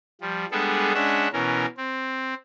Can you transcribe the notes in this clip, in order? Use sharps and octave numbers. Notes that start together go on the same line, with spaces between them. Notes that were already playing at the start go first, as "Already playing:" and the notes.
F3 G3
G3 G#3 B3 D4 G#4 A4
G#3 C#4 D4 E5 F#5
B2 E3 C#4 A#4
C4